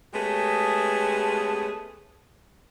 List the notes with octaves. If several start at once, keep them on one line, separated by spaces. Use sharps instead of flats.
G#3 A3 B3 C#4 G4 G#4